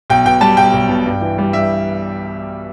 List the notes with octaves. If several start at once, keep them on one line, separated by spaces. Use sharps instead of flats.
B1 G5
B2 G5
G3 A5
B1 G5
B1
B2
G2
E3
G3
G2 E5